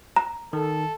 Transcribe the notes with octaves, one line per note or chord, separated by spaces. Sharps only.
A#5
D#3 A4